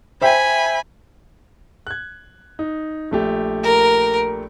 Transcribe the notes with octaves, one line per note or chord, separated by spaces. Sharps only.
C5 E5 G5 G#5 B5
F#6 G#6
D#4
A#1 A3 G4
A#4